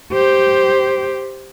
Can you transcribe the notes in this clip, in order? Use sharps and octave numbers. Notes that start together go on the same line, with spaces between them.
G4 C5